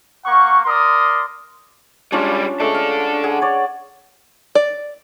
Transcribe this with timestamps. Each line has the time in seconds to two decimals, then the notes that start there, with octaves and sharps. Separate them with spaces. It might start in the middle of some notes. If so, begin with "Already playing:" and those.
0.25 A#3 F#5 C#6
0.66 A#4 D5 C6 D#6
2.12 G3 G#3 C#4 D4 F4
2.60 G#3 A3 D4 A4
2.74 F5
3.24 G#4 F#5
3.42 C#5 D5
4.55 D5